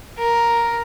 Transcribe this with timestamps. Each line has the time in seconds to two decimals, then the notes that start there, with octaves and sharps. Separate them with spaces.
0.18 A#4